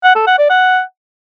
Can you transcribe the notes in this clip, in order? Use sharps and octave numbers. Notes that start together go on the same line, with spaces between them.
F#5
A4
F#5
D5
F#5